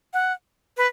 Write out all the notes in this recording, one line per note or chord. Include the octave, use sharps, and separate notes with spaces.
F#5
B4